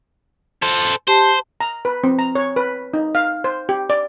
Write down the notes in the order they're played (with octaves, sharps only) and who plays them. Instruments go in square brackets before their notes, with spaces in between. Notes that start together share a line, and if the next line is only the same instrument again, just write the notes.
[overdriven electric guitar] A4 C5
[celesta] G4 A5 C7 [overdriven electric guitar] C5
[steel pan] A#5
B4
C4
A#5
C#5
B4
D#4
F5
C5
G4
D5